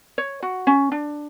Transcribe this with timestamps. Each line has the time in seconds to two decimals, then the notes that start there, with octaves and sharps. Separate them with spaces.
0.18 C#5
0.42 F#4
0.67 C#4
0.92 D4